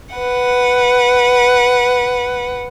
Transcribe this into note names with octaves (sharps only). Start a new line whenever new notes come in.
B4 F#5